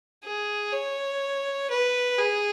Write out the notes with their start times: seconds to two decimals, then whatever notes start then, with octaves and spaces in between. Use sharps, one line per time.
0.24 G#4
0.72 C#5
1.70 B4
2.18 G#4